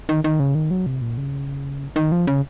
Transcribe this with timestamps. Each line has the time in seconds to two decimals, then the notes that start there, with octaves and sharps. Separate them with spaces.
0.09 D#3
0.24 D#3
0.40 C#3
0.55 D#3
0.71 F#3
0.86 C3
1.02 A#2
1.18 C#3
1.96 D#3
2.12 F3
2.27 C#3